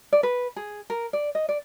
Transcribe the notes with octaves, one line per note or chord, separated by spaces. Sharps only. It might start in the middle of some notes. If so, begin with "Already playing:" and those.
D5
B4
G#4
A#4
D5
D#5
D5